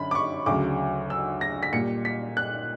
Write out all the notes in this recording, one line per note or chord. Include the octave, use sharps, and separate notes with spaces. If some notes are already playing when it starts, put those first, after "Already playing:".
Already playing: F#2 D3 B5
D6
C#6
D2 C#3 F#3 D6
E6
A#6
B6
A#2 G3 C#7
B6
F#6